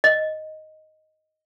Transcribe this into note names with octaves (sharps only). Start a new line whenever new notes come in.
D#5